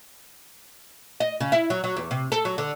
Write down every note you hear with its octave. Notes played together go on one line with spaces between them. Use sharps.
D#5
C#3
E4
F#3
F#3
E2
C3
A4
F#3
D3